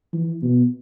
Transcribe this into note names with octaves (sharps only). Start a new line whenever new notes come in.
E3
B2